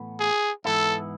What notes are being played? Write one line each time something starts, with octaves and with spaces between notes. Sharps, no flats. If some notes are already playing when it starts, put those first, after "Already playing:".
Already playing: A2 E3 B3
G#4
G#2 E3 B3 E4 A4